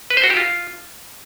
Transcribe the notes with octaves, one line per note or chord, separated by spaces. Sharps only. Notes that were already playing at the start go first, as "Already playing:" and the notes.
B4
C5
F#4
G4
F4